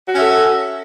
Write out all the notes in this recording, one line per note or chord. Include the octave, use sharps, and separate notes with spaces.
C#4 F#4 A4 E5